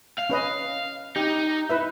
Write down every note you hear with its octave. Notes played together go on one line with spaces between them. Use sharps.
F5
C#4 B4 D#5
D#4 G4
E4 B4 E5